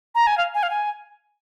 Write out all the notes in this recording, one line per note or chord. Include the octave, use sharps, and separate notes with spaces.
A#5
G#5
F5
G#5
F5
G#5